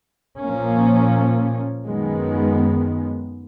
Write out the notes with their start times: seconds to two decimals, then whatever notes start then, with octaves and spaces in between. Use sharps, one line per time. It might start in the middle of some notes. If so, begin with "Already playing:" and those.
0.43 A#2 F3 A#3 C#4
1.87 F#2 D#3 G#3 B3